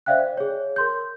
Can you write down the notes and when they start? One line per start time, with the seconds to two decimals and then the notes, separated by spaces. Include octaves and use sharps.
0.06 C5 D5 E5 F5 G5 F#6
0.19 D5
0.37 G#4 C#5
0.76 A#4 C6 G6